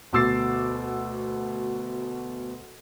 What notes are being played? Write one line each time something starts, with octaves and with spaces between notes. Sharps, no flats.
D2 B2 D6 E6 A6 C7